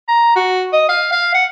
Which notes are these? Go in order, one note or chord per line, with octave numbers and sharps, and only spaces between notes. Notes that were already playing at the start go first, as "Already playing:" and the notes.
A#5
F#4
D#5
F5
F5
F#5